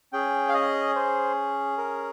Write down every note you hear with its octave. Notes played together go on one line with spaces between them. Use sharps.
C#4 G#4 G5
F5
D#5
C5
A#4